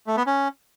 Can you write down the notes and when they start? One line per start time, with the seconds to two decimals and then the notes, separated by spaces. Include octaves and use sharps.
0.07 A3
0.17 B3
0.27 C#4